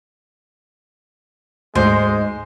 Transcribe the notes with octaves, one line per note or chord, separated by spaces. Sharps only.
D2 G#2 G#3 C5